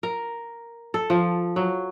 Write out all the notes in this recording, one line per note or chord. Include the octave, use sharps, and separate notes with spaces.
A#4
A4
F3
F#3